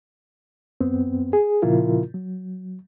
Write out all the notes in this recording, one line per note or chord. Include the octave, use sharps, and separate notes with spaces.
F#2 B3 C4
G#4
A#2 C#3 F3 E4 F4 A#4
F#3